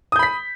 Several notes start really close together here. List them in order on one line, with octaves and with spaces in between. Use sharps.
D#6 G6 B5 B6